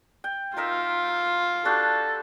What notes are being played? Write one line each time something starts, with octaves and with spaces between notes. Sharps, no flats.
G5
D#4 F4 A#4 E5
D4 F#4 G4 A4